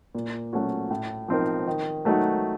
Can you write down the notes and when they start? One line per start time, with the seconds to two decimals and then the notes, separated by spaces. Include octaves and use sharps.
0.15 A#2
0.53 F#3 A3 C#4 F#4
0.90 A2
1.28 F3 C4 D#4 A#4
1.67 D#3
2.05 F#3 A3 D#4 F#4